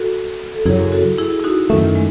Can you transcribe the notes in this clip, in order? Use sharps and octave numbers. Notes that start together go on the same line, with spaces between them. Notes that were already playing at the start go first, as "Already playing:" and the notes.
Already playing: F#4 A4
A4
F#2 C#3 F#3 E4 G#4
F#4 A4
E4 G#4
E4
D#4 F#4
F#2 D#3 A3 C#4 E4
G#3